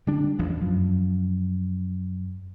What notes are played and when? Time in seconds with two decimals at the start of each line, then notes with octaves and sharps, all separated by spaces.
0.07 D3 G3 D4
0.39 A1 E2 F3
0.62 F#2 F3